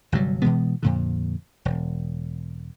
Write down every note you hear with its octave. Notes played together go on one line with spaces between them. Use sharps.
G1 C3 F#3 G3
B2 E3 G#3 B3
F2 A#2 D3
E1